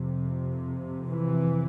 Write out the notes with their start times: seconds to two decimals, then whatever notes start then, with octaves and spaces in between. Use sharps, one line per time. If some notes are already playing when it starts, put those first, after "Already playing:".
Already playing: F2 C3
1.09 E3